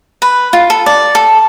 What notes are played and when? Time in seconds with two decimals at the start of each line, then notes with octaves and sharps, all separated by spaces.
0.22 B4
0.53 F4
0.70 A4
0.86 D5
1.15 A4